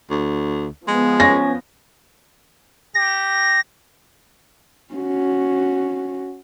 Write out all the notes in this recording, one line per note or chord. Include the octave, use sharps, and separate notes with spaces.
D2
F3 G#3 B3
C#4 A#6
G4 A#6
C#4 F#4